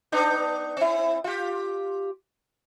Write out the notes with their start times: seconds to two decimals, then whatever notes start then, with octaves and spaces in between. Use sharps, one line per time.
0.12 B3 D4 D#4
0.77 C4 E4
1.24 F4 G4